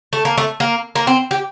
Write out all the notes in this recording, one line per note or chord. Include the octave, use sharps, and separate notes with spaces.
A3
A#3
A3
A#3
A#3
C4
G4